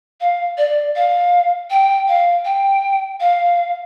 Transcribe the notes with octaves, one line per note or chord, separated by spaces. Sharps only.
F5
D5
F5
G5
F5
G5
F5